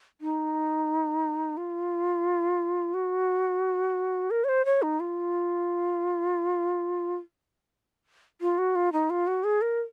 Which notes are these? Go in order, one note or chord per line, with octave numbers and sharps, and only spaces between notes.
D#4
F4
F#4
A#4
C#5
C5
C#5
D#4
F4
F4
F#4
F4
D#4
F4
F#4
G#4
A#4